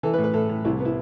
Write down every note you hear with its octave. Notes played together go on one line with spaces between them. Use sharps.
E3 A4
B4
A2
B4
A2 A4
A2
C2 E4
B3
E4